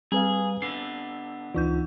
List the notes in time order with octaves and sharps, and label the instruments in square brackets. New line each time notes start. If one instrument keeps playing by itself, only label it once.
[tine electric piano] G3 B4 F5 [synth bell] C4 [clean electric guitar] G#4
[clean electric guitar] D3 B3 [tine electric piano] C7
[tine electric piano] C#2 F4 [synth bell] E3 D#4 G6